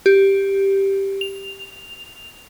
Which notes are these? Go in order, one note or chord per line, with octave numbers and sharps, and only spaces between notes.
G4
F7